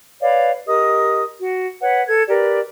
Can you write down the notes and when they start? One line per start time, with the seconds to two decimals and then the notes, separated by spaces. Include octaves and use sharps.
0.21 B4 C#5 D5 F5
0.67 G4 A#4 D#5 D#6
1.41 F#4
1.81 B4 C#5 F#5
2.08 A4 G#6
2.29 G4 A#4 B4 D5